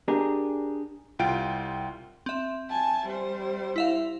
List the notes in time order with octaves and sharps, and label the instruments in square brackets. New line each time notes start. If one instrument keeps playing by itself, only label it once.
[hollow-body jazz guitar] D4 G4 G#4 A#4
[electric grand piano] C2 F4 G5 D7
[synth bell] C4 E5
[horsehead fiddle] G#5 A5
G3 C5
[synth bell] E4 E5 F5